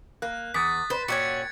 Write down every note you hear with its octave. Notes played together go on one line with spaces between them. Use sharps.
A#3 F#6
E2 D#6 A6 B6
B4 C5
A#2 C#4 E4 F#4 G5 G#6 C#7